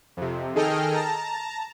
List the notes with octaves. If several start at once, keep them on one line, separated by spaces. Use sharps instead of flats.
F2 C3
D#3 G#4 A4 D#5 G5 F6
A5 A#5